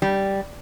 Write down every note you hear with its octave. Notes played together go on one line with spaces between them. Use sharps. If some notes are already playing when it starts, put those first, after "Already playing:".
G3